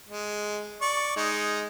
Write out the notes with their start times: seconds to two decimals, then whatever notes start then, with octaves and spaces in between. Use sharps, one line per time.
0.09 G#3
0.82 D5 C#6
1.17 G#3 D#4